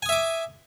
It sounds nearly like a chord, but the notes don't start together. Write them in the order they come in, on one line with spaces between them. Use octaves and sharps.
G#5 D#6 E5 D6